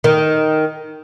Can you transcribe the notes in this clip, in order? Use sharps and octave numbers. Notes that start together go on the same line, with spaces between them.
D#3